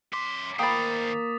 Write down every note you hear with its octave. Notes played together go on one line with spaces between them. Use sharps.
F#2 C6 D6 B6
D#3 A#3 C5 G5 B5 D#6 A6